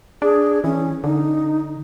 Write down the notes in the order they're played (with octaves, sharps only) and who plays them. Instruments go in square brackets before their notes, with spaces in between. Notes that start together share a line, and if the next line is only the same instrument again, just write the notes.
[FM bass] D4 [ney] G#4
[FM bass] E3 [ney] C#4
[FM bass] D3 [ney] D#4